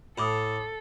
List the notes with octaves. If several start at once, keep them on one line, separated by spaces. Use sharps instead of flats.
A2 A4 B5 D6 D#6